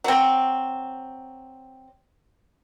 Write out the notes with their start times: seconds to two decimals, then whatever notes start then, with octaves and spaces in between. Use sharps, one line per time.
0.04 F#3 C4